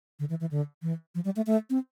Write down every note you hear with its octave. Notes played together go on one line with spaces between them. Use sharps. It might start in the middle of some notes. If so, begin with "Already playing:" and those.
D3
E3
E3
D3
E3
F3
G3
A3
A3
C4